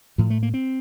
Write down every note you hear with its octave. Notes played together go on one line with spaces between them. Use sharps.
A2 F3
A3
A#3
C4